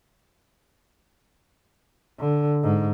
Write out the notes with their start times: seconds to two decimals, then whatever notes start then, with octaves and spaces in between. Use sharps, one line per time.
2.19 D3
2.63 G#2